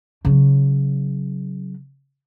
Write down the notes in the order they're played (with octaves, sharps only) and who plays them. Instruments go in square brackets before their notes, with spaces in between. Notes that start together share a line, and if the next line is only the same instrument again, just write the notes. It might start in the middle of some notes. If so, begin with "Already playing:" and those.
[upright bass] C#3 F#3